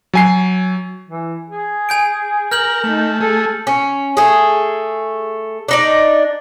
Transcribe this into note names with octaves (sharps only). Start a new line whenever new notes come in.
F#3 G#5 C7
E3
G#4
G#5 G6 D7
A#4 F6 G6 F#7
A3 D#4
A3 G#4 A4
C#4
A3 G#4
D4 D#4 D5